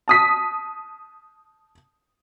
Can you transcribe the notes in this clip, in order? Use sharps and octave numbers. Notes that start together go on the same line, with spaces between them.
A5 D#6 B6